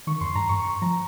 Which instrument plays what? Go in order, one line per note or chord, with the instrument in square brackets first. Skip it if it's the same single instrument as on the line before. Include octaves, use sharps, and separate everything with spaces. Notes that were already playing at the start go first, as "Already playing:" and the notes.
[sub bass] D#3 [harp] C#6
[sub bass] F2 [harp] C6
[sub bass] G2 [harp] A#5
[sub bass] G2 [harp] C#6
[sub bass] F3 [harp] A#5